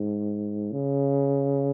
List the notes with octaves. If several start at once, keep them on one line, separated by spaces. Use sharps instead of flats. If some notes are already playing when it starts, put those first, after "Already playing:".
Already playing: G#2
C#3